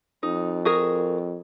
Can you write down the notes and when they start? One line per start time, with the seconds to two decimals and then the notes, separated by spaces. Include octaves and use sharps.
0.23 F2 D#4
0.65 F#4 G#4 A#4